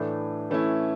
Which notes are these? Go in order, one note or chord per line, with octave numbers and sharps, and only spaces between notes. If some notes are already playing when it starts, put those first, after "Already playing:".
Already playing: A2 E3 A3 D4
E3 A3 C#4 E4